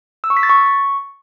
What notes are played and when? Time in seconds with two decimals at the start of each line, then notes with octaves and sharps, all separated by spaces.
0.24 E6
0.30 C#6
0.37 B6
0.43 A6
0.50 C#6